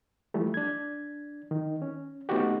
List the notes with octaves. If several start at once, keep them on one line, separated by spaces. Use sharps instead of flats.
E3 F3 G3 A3
D4 G#6
D#3
C#4
A3 B3 C#4 D#4 F#4 G4